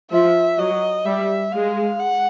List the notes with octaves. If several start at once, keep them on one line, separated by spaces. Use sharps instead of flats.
F3 E5
F#3 D#5
G3 E5
G#3 F5
F#5